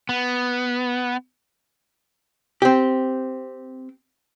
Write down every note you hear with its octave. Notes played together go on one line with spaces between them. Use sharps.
B3
C4 G4